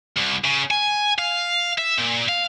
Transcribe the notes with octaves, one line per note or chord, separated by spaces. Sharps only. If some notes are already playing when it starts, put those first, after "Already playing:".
C2
C#3
G#5
F5
E5
A#2
F5